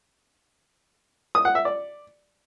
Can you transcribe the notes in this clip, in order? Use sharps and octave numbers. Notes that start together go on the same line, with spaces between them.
D#6
F#5
E5
D5